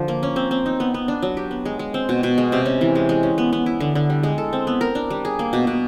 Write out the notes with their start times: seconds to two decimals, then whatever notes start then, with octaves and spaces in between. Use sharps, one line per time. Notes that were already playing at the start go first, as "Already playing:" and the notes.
Already playing: D3 F3
0.08 A#3
0.23 C#4
0.36 C4
0.51 C4
0.66 D#4
0.80 B3
0.94 B3
1.08 D4
1.22 F#3
1.37 G4
1.51 B3
1.65 G#3
1.79 G#3
1.94 C4
2.09 B2
2.23 B2
2.38 G#3
2.52 C3
2.66 C#4
2.81 E3
2.95 G#3
3.09 G#3
3.23 C#4
3.38 B3
3.53 B3
3.66 E4
3.80 D3
3.95 D3
4.10 G3
4.23 G#3
4.38 A4
4.53 C4
4.67 B3
4.81 A#4
4.95 D4
5.10 G3
5.25 G#4
5.39 A#3
5.53 B2
5.67 B2